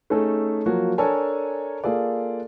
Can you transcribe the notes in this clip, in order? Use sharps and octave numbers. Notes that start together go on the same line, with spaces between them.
A3 C#4 D#4 G#4 A4
F3 F#3 A#3 F#4
D4 A4 A#4 C#5 G#5 A5
A#3 F4 G#4 A4 D5